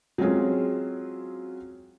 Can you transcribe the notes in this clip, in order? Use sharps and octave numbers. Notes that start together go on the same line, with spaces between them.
F#3 G#3 C4 C#4 F4 G#4